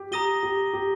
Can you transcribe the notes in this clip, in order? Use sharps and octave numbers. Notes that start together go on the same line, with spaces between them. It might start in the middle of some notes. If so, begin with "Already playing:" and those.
Already playing: G4
G4 A#5 D#6 A#6 D#7 G7
G4
G4